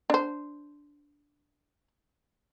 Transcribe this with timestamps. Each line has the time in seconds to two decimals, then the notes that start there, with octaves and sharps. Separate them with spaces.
0.10 D4 C5